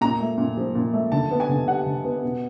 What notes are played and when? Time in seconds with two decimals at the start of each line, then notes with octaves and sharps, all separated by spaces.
0.01 A#2 A#5
0.20 A3
0.38 A#2
0.57 F3
0.75 A#2
0.94 A3
1.12 D3 A5
1.31 B3
1.40 G#5
1.49 D3
1.68 G3 F#5
1.86 D3
2.04 B3
2.22 B2